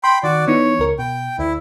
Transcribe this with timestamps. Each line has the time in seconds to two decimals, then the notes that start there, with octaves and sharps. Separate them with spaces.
0.04 G5 B5 C6
0.23 D#3 F#4 D5
0.47 E3 B3 D#4 C#5
0.79 C#2 A#4
0.99 B2 G5
1.39 D2 E4